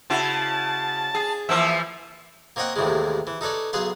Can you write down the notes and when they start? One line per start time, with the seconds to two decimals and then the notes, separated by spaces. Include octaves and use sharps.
0.10 C#3 E4 F#4 A5
1.15 G#4
1.49 E3 F3 A#3 E5
2.56 A#3 C4 C#5 D#5 F#5 G5
2.76 D#2 A2 C3 E3 G#3
3.27 E3
3.41 D#4 A4 B4 C#5 D5
3.73 B1 G#4 B4 F5 C6